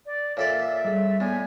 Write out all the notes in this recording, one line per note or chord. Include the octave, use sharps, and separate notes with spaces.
D5
A#2 A4 C#5 D5 E5
G3 G#4
A2 B3 D5 G#5